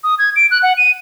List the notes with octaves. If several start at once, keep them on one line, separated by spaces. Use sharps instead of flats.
D#6
G#6
D7
F#6
F#5
D#7